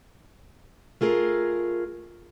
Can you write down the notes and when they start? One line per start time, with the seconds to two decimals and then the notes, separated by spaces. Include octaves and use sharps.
1.01 A3 F4 G#4 A#4